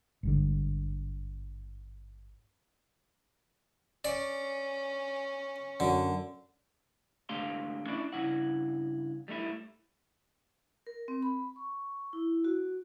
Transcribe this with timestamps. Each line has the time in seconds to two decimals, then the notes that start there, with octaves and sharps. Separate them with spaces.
0.23 G#1 G2 D3
4.05 C#4 D5
5.80 F#2 D3
7.29 G#2 D3 A3 G4 F5 C6
7.86 C#4 D4 E4 D5
8.13 G2 C#3 E4 F#5
9.28 G3 A3 D#4 E4
10.87 A#4
11.08 C4
11.23 B5
11.56 C#6
12.13 E4
12.45 F#4